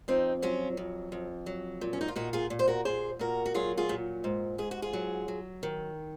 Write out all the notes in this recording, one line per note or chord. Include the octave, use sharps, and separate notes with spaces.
F2 C4 D#4
F#3 C#4 F4
F2
F2
F#3
A#2
C#4
D#4
F4
A#2 D#4 F#4
F4 G#4
A#2
C5
F#4 A#4
A#2 G#4 C5
A#2 F#4 A#4
F#4
F#3 F4 G#4
F4 G#4
A#2
G#2
G#2 G#4
F#4
F4 G#4
F#3
F#3
D#3